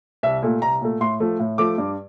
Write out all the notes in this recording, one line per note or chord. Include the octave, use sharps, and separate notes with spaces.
C2 E5
A#2 A3
C2 A#5
A#2 A3
A2 C6
F3 A3
A2
F3 A3 D6
G2